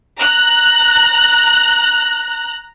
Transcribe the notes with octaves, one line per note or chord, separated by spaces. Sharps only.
A#5 F#6